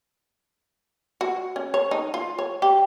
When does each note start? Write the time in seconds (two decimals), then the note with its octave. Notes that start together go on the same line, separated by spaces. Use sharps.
1.21 F#4
1.56 C#4
1.74 C#5
1.91 D#4
2.14 F4
2.39 C#5
2.62 G4